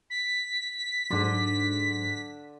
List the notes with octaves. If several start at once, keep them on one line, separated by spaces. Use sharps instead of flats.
B6
G#2 D3 F#3 D5 C6